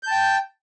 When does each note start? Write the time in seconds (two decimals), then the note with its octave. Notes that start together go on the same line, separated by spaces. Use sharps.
0.03 G6
0.07 A5
0.11 G5